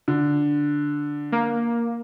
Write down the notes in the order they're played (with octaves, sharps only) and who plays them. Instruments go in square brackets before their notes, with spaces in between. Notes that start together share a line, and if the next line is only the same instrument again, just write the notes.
[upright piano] D3
[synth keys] A#3